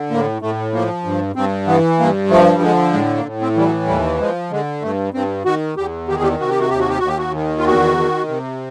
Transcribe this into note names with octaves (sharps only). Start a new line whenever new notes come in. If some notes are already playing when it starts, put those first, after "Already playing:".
Already playing: D3
A2 A#3
A2 A3
F3 A#3
G2
G2 C4
E3 B3
G2 A#3
F3 A3
G3
D3 G#3
A2 G#3
A#3
A2
C4
E3 G3
F#3
D#2 G3
F3 G#3
D3 G#3
G2 A3
G2 C4
D#3 F#4
E2 G4
D#3 G4
G#4
G4
C3 F#4
G4
F#4
D#2 G4
F#4
G4
D#2 F#4
G4
F#4
D#3
F4
E2 F#4
D#3
C3